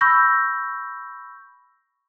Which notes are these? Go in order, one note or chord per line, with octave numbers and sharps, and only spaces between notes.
B5 C#6 E6 G6 A#6